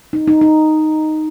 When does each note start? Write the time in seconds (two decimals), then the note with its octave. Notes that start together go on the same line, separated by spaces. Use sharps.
0.13 D#4
0.27 D#4
0.41 D#4